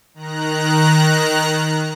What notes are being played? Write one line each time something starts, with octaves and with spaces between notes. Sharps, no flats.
D#3 A#5 F#6